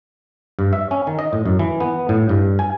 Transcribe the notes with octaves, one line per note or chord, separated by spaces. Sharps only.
G2
E5
C#4
D#3
D#5
A2
F#2
E3
B3
A2
G2
G#5